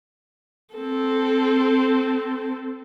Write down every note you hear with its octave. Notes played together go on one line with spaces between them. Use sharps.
C4 A4